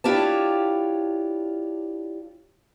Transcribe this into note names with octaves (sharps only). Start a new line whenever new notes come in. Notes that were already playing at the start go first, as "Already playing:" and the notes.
D4 E4 F4 G4 C#5 A5